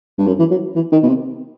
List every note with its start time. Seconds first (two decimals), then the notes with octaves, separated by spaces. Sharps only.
0.18 G2
0.27 F#2
0.39 E3
0.51 F#3
0.75 E3
0.92 D#3
1.02 B2
1.07 C3